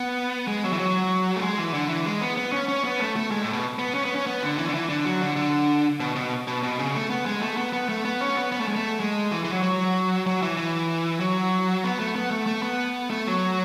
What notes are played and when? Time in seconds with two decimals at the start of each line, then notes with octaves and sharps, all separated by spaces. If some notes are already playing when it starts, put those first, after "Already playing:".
Already playing: B3
0.48 G#3
0.63 F#3
0.73 E3
0.79 F#3
1.36 A3
1.42 G#3
1.58 E3
1.74 D3
1.89 E3
2.05 G#3
2.21 B3
2.37 B3
2.52 C#4
2.68 C#4
2.84 B3
3.00 A3
3.16 A3
3.31 G#3
3.42 A2
3.53 B2
3.79 B3
3.94 C#4
4.05 B3
4.16 C#4
4.27 B3
4.42 D3
4.58 E3
4.69 D3
4.74 E3
4.89 D3
5.05 F#3
5.21 D3
5.36 D3
6.00 B2
6.16 B2
6.48 B2
6.63 B2
6.79 C#3
6.95 A3
7.10 B3
7.26 G#3
7.42 A3
7.57 B3
7.73 B3
7.89 A3
8.05 B3
8.21 C#4
8.37 B3
8.52 B3
8.60 A3
8.68 G#3
8.76 A3
9.00 G#3
9.31 E3
9.44 E3
9.52 F#3
9.63 F#3
10.26 F#3
10.42 E3
10.57 E3
11.20 F#3
11.84 B3
12.00 A3
12.16 B3
12.31 A3
12.46 A3
12.63 B3
13.10 A3
13.26 F#3